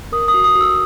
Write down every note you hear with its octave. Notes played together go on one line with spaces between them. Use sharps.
A#4 D#6
D#6
F#4
D#6
F#4
E6